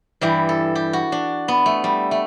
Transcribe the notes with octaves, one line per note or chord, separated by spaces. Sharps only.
G2 E3 G3 G4
A4
G4
F#4
D4
B3
A3
G3
A3